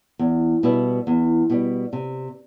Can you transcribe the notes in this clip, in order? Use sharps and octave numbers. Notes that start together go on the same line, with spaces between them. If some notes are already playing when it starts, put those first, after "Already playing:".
E2
B2 G3 B3 E4
E2
B2 G3
C3